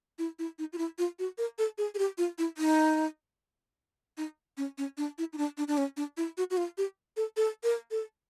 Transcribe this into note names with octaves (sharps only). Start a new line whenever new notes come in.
E4
E4
D#4
F4
E4
F4
F#4
A#4
A4
G#4
G#4
G4
F4
E4
D#4
D#4
C#4
C#4
D4
E4
D#4
D4
D4
D4
C#4
D4
E4
F#4
F#4
F4
G4
A4
A4
A#4
A4